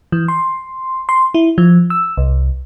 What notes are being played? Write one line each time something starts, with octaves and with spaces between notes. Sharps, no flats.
E3
C6
C6
E4
F3
E6
C2